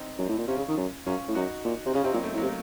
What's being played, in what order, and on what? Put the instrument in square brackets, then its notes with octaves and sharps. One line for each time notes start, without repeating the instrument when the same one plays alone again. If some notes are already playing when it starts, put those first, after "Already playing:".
Already playing: [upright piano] C4 D#4
[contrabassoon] F#2
A2
A#2
[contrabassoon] C3 [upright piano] C#4 F4
[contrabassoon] C#3
D#3
F#2
[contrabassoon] F#2 [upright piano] C#4 F4
[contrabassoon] A2
[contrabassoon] F#2 [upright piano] D#4 F#4
[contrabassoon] A#2
C3
[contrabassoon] C#3 [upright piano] C#4 F4
[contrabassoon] C3 [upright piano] C4 D#4
[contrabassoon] A#2 [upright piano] F#3 A#3
[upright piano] A3 C4
[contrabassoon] A2
[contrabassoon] C3 [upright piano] F#3 A#3